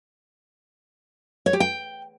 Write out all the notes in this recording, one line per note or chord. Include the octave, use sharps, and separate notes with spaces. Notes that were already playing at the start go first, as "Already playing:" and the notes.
C#5
G4
G5